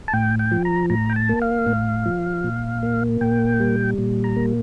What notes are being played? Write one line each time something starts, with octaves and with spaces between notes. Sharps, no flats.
A5
A2 G5
G5
F3
A#5
A2 A#5
G5
A5
A#3
F5
A2
F3
A#2
A#3
A#2 G5
G3
A#2
A#5
A#3